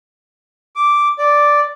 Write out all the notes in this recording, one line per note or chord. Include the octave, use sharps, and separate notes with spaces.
D6
D5